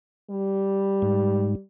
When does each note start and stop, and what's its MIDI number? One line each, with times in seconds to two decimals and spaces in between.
0.31 1.62 55
1.02 1.55 44